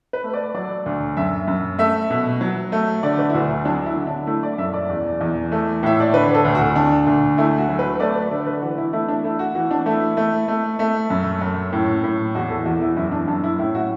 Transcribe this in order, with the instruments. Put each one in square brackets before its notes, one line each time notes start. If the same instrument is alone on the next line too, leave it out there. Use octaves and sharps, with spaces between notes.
[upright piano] B4
A3
D5
F#3 D5
D2
F#2 E5
F#2
A3 E5
B2
F#3
A3
D3 D5
B4
E4
D2 F#4
F#3 D4
E4
D3
D4
A3 E4
D5
F#2 E5
D5
E2
E2
A3
A2 E5
D5
D3 B4
A4
D2
F#4
D3 D4
D2
A3 E4
F#4
F#3
B4
A3 D5
B4
D3 D5
B4
E3 F#4
E4
A3 E4
D4
A3 E4
F#4
E3 F#4
D4
A3 E4
A3
A3
A3
F#2
F#2
A2
A2
E2 F#4
A4
E2 F#4
E4
F#2 E4
D4
F#2 D4
E4
A2 E4
F#4